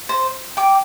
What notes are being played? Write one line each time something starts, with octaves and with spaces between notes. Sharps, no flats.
C5
G5 D6